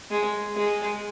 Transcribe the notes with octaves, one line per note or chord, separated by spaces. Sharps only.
G#3
G#3